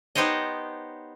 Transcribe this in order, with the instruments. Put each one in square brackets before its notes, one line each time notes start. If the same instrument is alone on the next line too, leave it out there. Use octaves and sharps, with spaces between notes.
[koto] B3 D#4 G4 C5 C#5 D#5